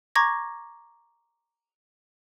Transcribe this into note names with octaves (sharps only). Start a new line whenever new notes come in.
A#5 C#6 D6 G#6 A#6